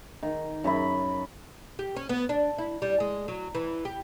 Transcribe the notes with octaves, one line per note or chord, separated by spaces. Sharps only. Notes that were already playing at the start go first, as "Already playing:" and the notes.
D#3
F#2 E5 B5
G4
C#4
B3
D4
E4
G3
G#3
F#3
E3
G4